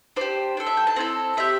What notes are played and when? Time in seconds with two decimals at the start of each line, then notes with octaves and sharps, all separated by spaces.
0.16 D4 G4 C5
0.57 D4 A4
0.67 E5
0.77 G5
0.87 A5
0.96 C4 E4 A4
1.37 C4 G4 E5